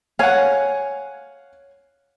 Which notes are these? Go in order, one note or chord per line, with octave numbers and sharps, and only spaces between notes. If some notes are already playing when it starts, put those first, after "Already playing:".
C#5 F5 F#5 G#5